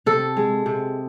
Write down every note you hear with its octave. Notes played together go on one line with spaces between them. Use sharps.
C3 A4
G#3
C3